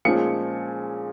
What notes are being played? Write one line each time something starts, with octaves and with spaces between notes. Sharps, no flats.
A#2 F3 G#3 C#4 C#7